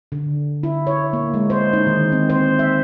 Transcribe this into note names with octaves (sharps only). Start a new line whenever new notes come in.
D3
E4
C#5
A#3
G#3
C5
D#4
D#3
C4
C5
E5